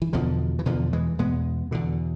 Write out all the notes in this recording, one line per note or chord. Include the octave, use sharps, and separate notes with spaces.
E3
E2 B2 D3 F3
E3
E2 B2 D3 F3
E3 G#3
E2 B2 G#3 B3
E2 B2 D3